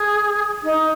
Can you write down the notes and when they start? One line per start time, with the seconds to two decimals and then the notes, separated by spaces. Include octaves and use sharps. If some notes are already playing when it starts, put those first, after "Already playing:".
Already playing: G#4
0.63 D#4